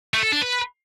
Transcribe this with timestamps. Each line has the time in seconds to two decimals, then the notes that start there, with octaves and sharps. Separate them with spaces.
0.14 A3
0.23 A4
0.33 D4
0.42 B4